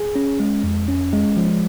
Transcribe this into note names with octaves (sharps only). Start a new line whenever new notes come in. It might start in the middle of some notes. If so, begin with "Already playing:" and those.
Already playing: G#4
C#4
G#3
F2
C#4
G#3
F3